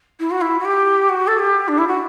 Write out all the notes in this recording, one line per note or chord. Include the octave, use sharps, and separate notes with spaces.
E4
F#4
E4
F#4
G4
F#4
A4
G4
D4
E4
F#4